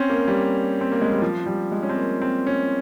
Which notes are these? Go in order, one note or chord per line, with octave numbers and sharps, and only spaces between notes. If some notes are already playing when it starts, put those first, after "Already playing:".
Already playing: C4 C#4
A#3
G3
C4
A#3
G#3
G3
F3
G3
G#3
C#4
C4
A#3
C4
C#4